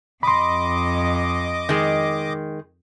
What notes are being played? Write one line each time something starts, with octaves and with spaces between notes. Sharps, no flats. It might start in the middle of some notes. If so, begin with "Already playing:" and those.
F2 D#5 B5 C6 D6
D#3 G#3